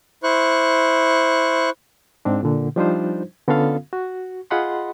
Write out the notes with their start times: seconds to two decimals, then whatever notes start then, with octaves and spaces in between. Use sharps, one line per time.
0.23 E4 C5 C#6 F#6
2.25 G#2 C4 D4
2.43 A#2 D3
2.76 F3 G3 D4 D#4 F4 C5
3.47 D3 B3 C#4 F4 A4 F5
3.93 F#4
4.51 F4 G#4 D#5 F#5 B5 C6